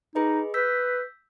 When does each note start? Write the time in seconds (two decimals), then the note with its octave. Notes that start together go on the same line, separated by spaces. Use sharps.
0.15 D#4 G#4 B4 D#5
0.54 B4 E6 G6 B6